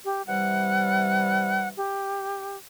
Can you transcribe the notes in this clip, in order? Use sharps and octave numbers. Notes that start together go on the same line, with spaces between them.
G4
C3 E3 G3 F#5
G4